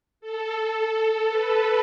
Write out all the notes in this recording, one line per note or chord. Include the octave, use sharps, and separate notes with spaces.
A4
A4
A4
B4